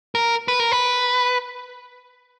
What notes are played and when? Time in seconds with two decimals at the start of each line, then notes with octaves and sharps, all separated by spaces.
0.15 A#4
0.48 B4
0.60 A#4
0.72 B4